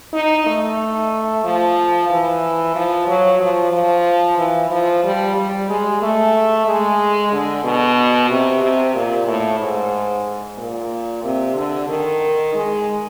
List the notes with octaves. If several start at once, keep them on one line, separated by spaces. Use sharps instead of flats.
D#4
A3
F3
E3
F3
F#3
F3
F3
E3
F3
G3
G3
G#3
A3
G#3
D3
B2
C3
C3
A#2
A2
G#2
A#2
C3
D3
D#3
G#3